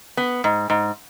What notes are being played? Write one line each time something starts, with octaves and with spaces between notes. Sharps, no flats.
B3
G#2
G#2